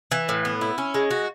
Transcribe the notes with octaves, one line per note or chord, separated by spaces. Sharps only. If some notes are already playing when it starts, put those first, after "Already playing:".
E3
A2
B3
E4
C#4
G#3
F#4